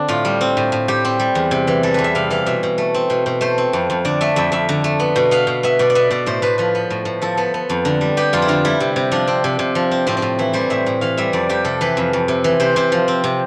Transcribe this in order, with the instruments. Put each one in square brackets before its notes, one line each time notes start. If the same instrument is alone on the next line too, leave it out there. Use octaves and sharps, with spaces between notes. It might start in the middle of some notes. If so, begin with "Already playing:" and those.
Already playing: [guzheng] D3 C4 D4
A2 F4
G3
C4
A2
A2
G3 G4
C4
G3
E2
C3
E3
G3 A4
E2 B4
E5
C3 F5
E3 F5
B2 E5
B2
A3
C4
B2
B2
A3 C5
C4
F2
F2
D3 D5
A3 E5
F2 E5
F2 E5
D3
A3
B3
B2
B3 F5
B2
B3 E5
B2 D5
D5
B3 E5
B2 D5
A2 C5
A2 B4
F3 B4
B3
A2
A2
F3 A4
B3 A4
B3
F2
D3
G3
B3 G4
F2 F4
E4
D3 F4
G3 E4
C3
C3
F3 D4
C4
C3
C3
F3
C4
A2 C4
C4
A2
E3 E4
G3 C5
A2 E5
A2
E3 F5
G3 E5
F2 D5
F2 G4
C3 A4
E3 B4
F2
F2
C3
E3
C3 C5
C3 C5
F3
C4
C3